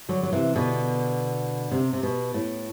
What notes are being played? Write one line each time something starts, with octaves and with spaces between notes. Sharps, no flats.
D3 F#3
F#3
C3 E3
B2 D3
C3
C3
B2
A2